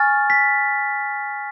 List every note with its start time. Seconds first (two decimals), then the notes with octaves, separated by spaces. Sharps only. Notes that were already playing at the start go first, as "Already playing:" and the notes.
Already playing: G#5 C#6 F6 A6
0.30 B6